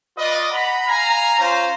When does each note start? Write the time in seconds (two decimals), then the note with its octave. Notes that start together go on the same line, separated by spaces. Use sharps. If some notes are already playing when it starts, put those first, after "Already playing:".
0.18 F4 B4 D5 D#5
0.51 F#5 A#5 B5
0.87 F5 G#5 A#5
1.39 C#4 F4 C5 F5 A#5